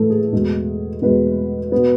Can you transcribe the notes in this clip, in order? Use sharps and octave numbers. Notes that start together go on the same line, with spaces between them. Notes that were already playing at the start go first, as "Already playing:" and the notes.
Already playing: A2 E3 A3 A4 B4
G#4
E2 B2 G#3
E2 B2 G#3 B4
B2 B3